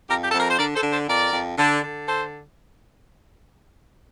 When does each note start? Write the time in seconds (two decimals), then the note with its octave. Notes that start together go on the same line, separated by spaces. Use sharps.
0.09 F2 G4 A#4
0.22 G4
0.30 F2 A4
0.39 A#4
0.50 C5
0.58 D3 A#4 D5
0.75 A4 C5
0.83 D3
0.91 A4 C5
1.08 F2 A#4 D5
1.33 F2
1.58 D3
1.82 D3
2.07 A4 C5